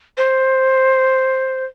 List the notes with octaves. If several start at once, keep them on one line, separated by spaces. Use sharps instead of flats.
C5